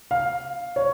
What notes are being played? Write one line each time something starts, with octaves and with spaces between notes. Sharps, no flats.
F5
C#5